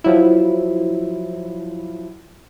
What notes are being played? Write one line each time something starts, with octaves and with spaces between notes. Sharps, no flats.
F3 F#3 E4